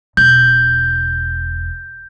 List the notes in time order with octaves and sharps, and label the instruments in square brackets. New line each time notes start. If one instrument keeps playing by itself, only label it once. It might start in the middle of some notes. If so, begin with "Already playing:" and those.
[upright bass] E1 [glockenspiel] G6